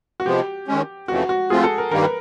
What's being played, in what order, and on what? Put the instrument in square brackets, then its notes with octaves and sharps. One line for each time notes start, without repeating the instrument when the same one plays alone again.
[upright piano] F#4
[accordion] C3 F3 G#3 B3 [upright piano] G4
[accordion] D#3 G#3 C#4
[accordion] F2 C#3 E3 A3 [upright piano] F#4
[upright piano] F#4
[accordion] F3 A3 C4 F4 [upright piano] G#4
[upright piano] A4
A#4
[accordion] G2 D#3 G3 A#3 [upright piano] A#4
[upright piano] B4